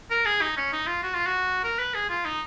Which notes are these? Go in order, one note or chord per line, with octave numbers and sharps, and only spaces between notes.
A#4
G#4
D#4
C#4
D#4
F4
F#4
F4
F#4
A#4
B4
G#4
F4
D#4